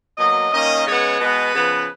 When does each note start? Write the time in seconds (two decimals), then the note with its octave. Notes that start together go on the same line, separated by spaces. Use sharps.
0.18 B2 F#3 A#3 D#5
0.52 D#3 A#3 C#4 D#5
0.85 C#3 G#3 B3 C#5
1.19 B2 G#3 B3 B4
1.53 C#3 F3 B3